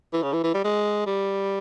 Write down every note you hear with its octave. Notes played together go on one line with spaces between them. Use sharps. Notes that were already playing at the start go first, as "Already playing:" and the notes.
E3
C#3
E3
E3
G3
G#3
G3